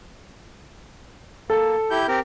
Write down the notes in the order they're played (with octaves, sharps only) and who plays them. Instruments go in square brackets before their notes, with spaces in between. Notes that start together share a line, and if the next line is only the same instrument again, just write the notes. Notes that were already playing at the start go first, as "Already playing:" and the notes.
[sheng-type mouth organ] A#3 [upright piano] A4
[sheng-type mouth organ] E4 G4 G6
C4 G4 A#4